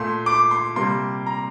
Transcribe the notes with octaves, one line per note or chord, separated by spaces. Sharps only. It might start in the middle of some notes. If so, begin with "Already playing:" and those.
Already playing: A#2 A3 C6
D6
C6
C3 G3 A#3 C6
A#5